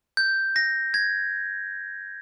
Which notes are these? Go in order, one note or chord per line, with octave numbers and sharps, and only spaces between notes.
G6
A#6
G#6